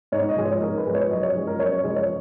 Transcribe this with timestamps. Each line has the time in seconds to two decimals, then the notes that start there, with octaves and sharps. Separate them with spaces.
0.12 G#2 C#5
0.29 D#5
0.36 F3 G#3
0.45 C#5
0.61 G#2 A#4
0.78 B4
0.86 F3 G#3
0.94 C#5
1.11 F#2 D#5
1.23 C#5
1.35 F3 G#3
1.47 A#4
1.59 F#2 C#5
1.72 C#5
1.84 F3 G#3 D#5
1.96 C#5